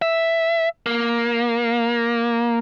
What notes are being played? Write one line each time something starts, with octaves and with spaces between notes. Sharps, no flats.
E5
A#3